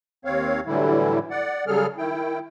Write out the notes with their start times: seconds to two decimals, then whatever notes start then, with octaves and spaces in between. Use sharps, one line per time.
0.25 D#2 C4 C#5 F5
0.67 A2 D3 E3 F#3 G3 E4
1.31 D5 F#5
1.67 C#3 F#3 G3 G#4 A4 F6
1.98 D#3 E4 G5